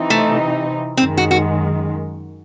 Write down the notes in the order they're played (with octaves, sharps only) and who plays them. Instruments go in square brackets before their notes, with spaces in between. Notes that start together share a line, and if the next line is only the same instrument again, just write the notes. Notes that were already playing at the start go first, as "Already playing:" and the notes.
Already playing: [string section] C3 E3 C4 D#4
[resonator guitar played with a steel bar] A3
[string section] F#2 D#3 G#3 [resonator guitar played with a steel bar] C4
[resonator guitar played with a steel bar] F#4
F#4